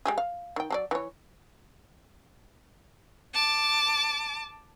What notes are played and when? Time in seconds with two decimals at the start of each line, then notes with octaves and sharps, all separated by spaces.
0.05 G#3 G4 G#4
0.18 F5
0.56 D#3 G5
0.70 F#3 A4 D5
0.91 E3 C#5
3.33 A5 D6